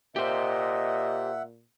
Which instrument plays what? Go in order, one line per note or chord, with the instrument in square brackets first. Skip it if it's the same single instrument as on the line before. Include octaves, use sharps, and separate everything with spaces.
[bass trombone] A#2 [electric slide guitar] G4 C5 [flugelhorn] D#5 [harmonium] E5 F#5